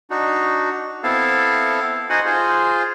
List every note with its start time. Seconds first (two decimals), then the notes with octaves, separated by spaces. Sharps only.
0.10 D4 D#4 F#4
1.03 B3 C4 E4 A4 F5 A5
2.10 D#4 F#4 C5 F#5 G#5
2.25 F4 G#4 C5